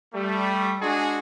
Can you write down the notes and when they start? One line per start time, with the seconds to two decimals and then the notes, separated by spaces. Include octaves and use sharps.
0.13 G3 A3
0.81 G#3 D4 F#4 G#4